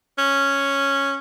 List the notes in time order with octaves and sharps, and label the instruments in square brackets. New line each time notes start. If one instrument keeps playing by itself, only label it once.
[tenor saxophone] C#4